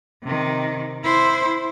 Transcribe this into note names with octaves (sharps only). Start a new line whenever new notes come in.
C3 D#3
E4 C5